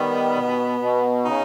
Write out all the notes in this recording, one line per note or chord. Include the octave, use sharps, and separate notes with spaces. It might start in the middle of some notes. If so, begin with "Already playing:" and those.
Already playing: D#3 G3 B3
B2
B2
C#3 D#4